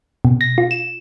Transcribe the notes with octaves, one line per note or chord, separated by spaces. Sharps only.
B2
A#6
F4
E7